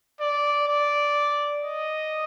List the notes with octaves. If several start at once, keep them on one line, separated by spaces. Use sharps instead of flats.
D5
D5
D#5